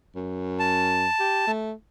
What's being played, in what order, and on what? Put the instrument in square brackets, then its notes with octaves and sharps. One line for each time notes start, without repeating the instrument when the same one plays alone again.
[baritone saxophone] F#2
[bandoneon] A5
[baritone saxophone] G4
A3